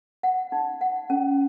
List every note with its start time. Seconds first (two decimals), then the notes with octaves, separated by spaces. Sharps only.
0.23 F#5
0.52 D#4
0.81 F#5
1.10 C#4